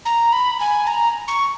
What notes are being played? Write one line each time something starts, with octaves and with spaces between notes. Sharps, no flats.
A#5
B5
G#5
A#5
C#6